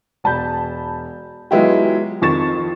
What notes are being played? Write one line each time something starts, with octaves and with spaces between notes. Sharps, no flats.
E1 A5 B5 G6
F#3 G#3 B3 E4 F4 G4
F2 D#3 F3 C#6 A6 E7